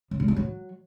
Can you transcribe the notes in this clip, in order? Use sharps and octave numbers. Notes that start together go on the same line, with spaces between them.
C#3
G#2
D3
F#3